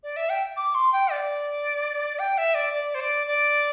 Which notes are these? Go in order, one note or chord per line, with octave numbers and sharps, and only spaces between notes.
D5
E5
G5
D6
C6
G5
D5
G5
E5
D5
D5
C5
D5
D5